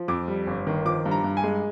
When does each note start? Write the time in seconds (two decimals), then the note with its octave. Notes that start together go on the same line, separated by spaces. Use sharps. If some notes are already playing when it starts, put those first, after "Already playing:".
Already playing: F3
0.08 F2 D6
0.28 G3
0.47 G1
0.67 D#3
0.85 F3 D6
1.06 G2
1.11 A#5
1.24 G2
1.37 G#5
1.44 G#3